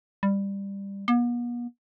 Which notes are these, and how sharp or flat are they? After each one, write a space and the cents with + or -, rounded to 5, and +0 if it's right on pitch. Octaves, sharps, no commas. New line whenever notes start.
G3 +15
B3 -45